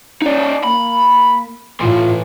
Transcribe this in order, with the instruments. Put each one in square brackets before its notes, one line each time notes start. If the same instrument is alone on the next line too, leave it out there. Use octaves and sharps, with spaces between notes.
[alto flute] C#4 [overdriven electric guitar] D#4 D5
[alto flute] A#3 [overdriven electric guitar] B5
[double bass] A2 [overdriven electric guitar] E3 C6 [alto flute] F4